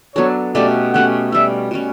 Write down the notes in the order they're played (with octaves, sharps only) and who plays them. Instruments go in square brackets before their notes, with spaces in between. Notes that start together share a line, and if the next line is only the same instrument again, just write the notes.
[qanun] F#3 B3 D4 A4 [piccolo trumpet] C#5
[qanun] B2 A3 C#4 G4 [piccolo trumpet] D5
[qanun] B2 A3 C#4 G4 [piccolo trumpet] F#5
[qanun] B2 G3 C#4 [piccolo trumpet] E5
[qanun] B2 G3 C#4